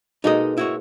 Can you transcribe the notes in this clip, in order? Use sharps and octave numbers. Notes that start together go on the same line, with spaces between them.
B2 G#3 A#3 D#4 A4 D#5
E4 F#4 C#5